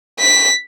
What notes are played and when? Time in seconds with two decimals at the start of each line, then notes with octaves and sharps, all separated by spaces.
0.20 B6